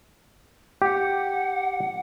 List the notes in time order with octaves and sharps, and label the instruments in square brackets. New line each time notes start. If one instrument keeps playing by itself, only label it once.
[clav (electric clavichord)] G4 [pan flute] F#5